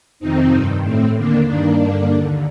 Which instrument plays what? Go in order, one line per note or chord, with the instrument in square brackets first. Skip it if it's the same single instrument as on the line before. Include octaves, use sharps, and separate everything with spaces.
[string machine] F2 C3 D#3 C4 D#4
G2 D#3
A2 A3 C4
D#2 D3 A#3 D4
G2 D#3 A#3 D4
G2 D3
D#2 D3